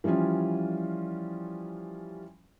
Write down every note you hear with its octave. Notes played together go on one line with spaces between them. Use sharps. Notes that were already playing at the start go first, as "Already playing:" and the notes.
E3 F3 G3 C#4 F4